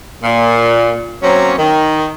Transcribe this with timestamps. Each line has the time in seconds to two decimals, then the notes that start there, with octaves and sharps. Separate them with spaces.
0.23 A#2
1.23 F#3 A#3 C4 C#4
1.58 D#3